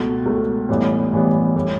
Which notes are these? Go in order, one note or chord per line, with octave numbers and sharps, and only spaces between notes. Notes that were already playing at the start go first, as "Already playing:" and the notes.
Already playing: C#2 B2 A3
C#2 B2 A3
A1 A2 E3 G3 B3
A1 A2 E3 G3 B3
A2 G3